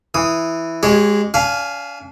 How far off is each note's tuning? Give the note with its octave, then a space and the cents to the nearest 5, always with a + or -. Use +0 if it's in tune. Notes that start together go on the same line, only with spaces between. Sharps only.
E3 +0 D#6 +0
G#3 -10 G4 -35 C#5 +0
D4 -40 F5 +0 G#5 -10